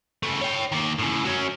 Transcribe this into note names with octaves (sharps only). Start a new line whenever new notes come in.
C#3 A3
C#5 G5
D#3 A#3
A2 C#3
F#3 C#4